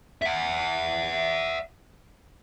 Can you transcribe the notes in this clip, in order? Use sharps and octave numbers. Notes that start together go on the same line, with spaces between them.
E5 F#5